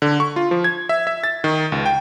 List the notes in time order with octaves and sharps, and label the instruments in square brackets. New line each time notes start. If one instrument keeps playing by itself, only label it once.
[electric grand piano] D3
C#6
F4
F3
G#6
E5
E5
A6
D#3
C#2
G5